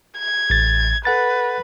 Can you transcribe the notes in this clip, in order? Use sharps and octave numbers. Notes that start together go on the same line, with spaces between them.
G#6
A1 A6
A4 B4 F#5 A6